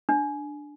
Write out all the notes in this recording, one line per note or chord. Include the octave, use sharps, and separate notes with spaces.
D4